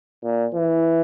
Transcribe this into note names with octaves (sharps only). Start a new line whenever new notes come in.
A#2
E3